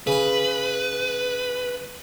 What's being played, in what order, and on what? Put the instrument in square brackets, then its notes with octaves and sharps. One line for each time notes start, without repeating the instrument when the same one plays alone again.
[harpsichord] C#3 G#5 [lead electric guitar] B4